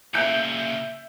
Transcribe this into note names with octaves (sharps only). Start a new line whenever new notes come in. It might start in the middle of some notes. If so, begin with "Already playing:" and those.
A#2 C#3 E5 G6 D7